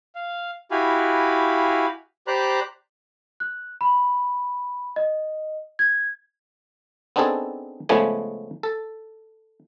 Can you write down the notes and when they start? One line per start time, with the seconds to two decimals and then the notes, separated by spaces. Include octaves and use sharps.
0.15 F5
0.71 E4 F#4 G4 F5 G#5 B5
2.27 G4 C5 D5 A#5 B5 F#6
3.40 F#6
3.81 B5
4.96 D#5
5.79 G#6
7.16 B3 C4 D4 D#4 G#4 A4
7.89 C#3 F3 G#3 A3 B3 G#5
8.63 A4